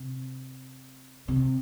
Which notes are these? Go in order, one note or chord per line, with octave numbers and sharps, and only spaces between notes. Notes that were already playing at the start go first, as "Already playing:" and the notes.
Already playing: C3
C3